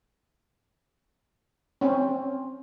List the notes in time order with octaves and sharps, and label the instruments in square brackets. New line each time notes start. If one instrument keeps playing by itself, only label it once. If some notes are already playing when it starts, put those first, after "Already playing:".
[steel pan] C4 C#4